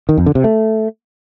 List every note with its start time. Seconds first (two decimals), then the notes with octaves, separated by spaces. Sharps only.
0.09 D#3
0.18 F2
0.26 D3
0.35 C3
0.44 A3